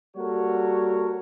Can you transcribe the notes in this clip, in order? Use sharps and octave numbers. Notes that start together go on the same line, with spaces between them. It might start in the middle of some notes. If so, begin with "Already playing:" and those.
G3 A#3 F#4 A4 A#4 C#5